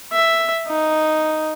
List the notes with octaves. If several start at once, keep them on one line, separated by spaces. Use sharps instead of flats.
E5
D#4